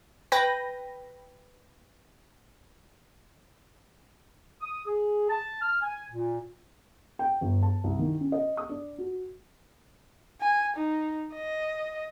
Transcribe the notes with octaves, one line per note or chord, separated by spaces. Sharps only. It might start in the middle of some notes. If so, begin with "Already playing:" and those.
B4 G5 A#6
D#6
G#4
A5
F6
G#5
A#2
G5
G1
A5
C2
D#3
C#4
D#5
D#6
D4
F#4
G#5
D#4
D#5